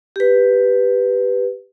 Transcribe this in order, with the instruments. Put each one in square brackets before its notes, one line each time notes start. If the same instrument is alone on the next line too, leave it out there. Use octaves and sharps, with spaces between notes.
[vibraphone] G4 B4